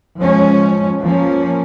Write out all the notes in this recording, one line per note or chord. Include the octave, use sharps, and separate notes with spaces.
F3 G#3 C#4
F3 A#3 C#4